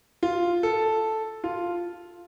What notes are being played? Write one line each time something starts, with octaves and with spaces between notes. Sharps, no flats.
F4
A4
F4